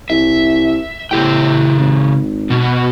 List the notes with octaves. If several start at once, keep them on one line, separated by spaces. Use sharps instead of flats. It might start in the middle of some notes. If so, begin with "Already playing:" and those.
C2 E5
A2 C#3 G4 G5
G#1
B2 F#4